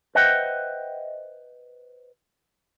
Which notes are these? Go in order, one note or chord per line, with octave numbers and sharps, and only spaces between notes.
B4 C5 D#5 E5 F#5 G5